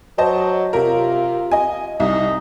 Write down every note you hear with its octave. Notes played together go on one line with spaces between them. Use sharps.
F#3 C5 D#5 A5
C3 F4 A#4
D#5 G#5
C2 D#4